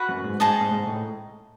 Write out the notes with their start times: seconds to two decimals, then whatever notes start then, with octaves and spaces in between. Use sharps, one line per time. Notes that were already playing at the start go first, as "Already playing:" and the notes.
Already playing: F#4 B4 F#5 B5
0.09 F#2
0.24 G#2
0.40 G#2 D#4 G#4 D#5 A5
0.61 G#2
0.71 G#2
0.87 A2